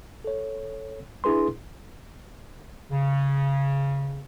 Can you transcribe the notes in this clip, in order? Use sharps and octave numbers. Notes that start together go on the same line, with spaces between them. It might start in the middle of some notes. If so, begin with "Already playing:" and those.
A4 C#5
D4 E4 G#4 B4 C6
C#3